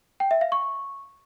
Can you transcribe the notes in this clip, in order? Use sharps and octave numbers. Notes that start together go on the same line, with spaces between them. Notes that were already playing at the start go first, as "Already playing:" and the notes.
G5
E5
F5
C#6